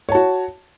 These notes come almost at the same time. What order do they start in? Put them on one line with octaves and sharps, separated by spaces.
C#5 A5 F#4